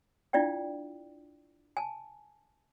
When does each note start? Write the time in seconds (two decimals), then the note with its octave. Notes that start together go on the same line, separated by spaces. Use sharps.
0.33 D4 E4 F4 D5 F5 G5
1.77 G#5 A5